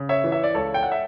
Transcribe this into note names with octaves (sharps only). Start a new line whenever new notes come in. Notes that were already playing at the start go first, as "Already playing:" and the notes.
Already playing: C#3
C#5 E5
E3
E5
D5
C#2 A4 C#5
G5
F#5
E5